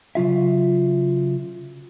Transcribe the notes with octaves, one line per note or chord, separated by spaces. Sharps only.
C#3 F#3 F4 E5